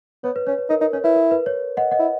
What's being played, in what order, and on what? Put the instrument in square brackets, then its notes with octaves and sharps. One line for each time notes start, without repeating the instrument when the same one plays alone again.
[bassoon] B3 [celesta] C#5
[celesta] B4
[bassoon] C#4 [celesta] C#5
[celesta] B4
[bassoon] D#4 [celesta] A#4
[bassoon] D#4 [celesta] A#4
[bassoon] C#4 [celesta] C#5
[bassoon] E4 [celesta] B4
[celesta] A#4
B4
C#5
D#5 F#5
D#5 F#5
[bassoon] E4